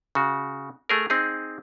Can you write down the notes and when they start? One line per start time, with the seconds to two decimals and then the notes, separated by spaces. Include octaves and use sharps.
0.15 C#3 F#4
0.89 A3 G#4 A#4
1.10 C4 D#4 G#4